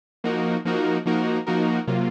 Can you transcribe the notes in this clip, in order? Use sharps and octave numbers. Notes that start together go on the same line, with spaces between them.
F3 A#3 D#4 F#4 A#4
F3 A#3 D#4 F#4 A#4
F3 A#3 D#4 F#4 A#4
F3 A#3 D#4 F#4 A#4
C3 F#3 A#3 F4